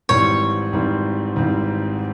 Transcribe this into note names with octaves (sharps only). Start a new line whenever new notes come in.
G#1 G#2 E3 G3 C4 C#5
G#1 G#2 E3 G3 C4
G#1 G#2 E3 G3 C4